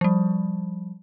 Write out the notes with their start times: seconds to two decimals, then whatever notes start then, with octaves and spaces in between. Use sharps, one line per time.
0.01 F3 G3